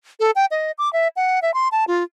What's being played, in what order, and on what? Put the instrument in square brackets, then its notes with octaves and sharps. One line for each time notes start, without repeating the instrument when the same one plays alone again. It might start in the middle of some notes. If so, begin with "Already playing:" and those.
[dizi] A4
G5
D#5
D6
E5
F#5
E5
C6
A5
F4